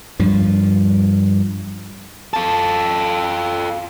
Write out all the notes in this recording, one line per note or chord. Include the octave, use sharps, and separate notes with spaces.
G2 F3
F4 A4